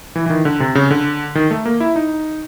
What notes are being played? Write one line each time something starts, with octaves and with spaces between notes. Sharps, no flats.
E3
E3
D#3
D3
C3
C#3
D3
D#3
A3
A#3
E4
D#4